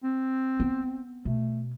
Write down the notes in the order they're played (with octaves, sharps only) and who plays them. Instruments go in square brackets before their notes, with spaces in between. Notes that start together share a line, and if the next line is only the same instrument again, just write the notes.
[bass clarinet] C4
[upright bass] B3
[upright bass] B2 [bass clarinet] A3